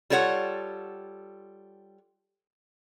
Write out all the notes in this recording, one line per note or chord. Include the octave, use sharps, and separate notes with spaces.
G3 F4 A4 C#5 F#5